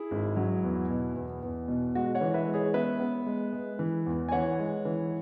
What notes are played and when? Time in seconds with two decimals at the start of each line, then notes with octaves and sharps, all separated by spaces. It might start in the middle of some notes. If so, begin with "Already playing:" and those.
Already playing: E4 G#4
0.11 G#1
0.36 F#3
0.64 E2
0.90 B2
1.15 E2
1.43 E2
1.68 B2
1.95 G#3 F#4
2.15 C#5 F#5
2.21 E3
2.34 B4 E5
2.47 G#3
2.54 G#4 C#5
2.74 B3 B4 E5
3.00 B3
3.26 G#3
3.53 G#3
3.79 E3
4.06 E2
4.29 G#5
4.32 E3 C#5 F#5
4.59 G#3
4.85 E3